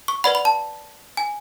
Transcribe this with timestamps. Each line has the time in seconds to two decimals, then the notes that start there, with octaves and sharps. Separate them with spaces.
0.08 C#6
0.24 B4 D5 F#5 B5
0.35 B5
0.45 A5
1.17 G#5